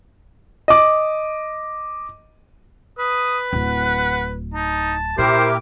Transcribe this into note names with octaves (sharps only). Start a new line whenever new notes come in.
D#5 D6
B4 D#6
D1 F#5
D#4 A5
A#2 E4 G4 A#4 C5 D6